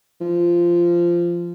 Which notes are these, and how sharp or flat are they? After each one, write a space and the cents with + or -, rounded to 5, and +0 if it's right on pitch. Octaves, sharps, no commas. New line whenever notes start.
F3 -15